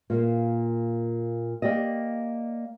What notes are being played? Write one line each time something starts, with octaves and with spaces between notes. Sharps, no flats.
A#2 A#3
A#3 G4 D5 D#5